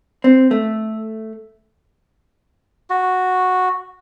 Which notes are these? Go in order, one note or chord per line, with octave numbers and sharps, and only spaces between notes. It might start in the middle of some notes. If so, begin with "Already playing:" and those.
C4
A3
F#4